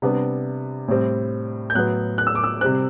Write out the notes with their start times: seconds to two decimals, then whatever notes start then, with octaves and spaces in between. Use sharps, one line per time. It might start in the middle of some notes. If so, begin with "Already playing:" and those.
0.02 C3 G3 B3 D4
0.88 A2 G3 C4
1.70 G6
1.75 A2 F#3 B3 F#6
2.18 F#6
2.27 E6
2.35 D6
2.44 E6
2.61 C3 G3 C4 F#6